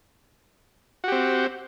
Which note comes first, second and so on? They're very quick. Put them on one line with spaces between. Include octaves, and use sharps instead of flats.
F#4 G4 C4